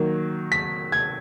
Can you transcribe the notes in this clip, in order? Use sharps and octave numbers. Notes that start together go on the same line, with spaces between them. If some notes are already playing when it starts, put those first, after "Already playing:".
Already playing: D#3 F#3 A#3
B6
G#6